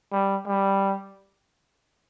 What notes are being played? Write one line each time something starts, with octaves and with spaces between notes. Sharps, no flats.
G3
G3